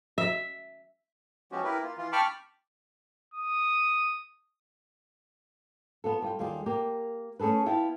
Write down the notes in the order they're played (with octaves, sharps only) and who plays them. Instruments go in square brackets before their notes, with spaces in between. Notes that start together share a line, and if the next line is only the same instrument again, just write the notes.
[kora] E5
[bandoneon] F3 G#3 B3 C#4 F#4 G4
E4 G4 A#4 B4
A#3 F4
E3 F4
G5 A5 B5 C#6 D6 F6
[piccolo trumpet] D#6
[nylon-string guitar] B3 F4 A4
G3 F4 G5
D#2 G3 F4 G#4
A#3 G4
A3 C#4 G#4 A4 B4
B3 E4 F4 G5 A5